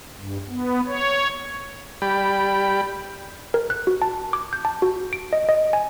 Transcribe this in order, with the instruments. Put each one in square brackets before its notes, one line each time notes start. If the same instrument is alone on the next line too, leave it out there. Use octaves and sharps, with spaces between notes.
[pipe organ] G2
B3
C#5
[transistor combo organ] G3 G4 D5 B5
[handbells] A#4
F#6
F#4
A5
D6
G6
A5
F#4
D7
D#5
D#5
G#5